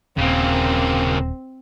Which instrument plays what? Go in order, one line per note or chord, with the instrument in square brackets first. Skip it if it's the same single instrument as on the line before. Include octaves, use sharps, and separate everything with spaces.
[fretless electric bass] D#1 [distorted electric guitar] C#3 A#3 [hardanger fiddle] C4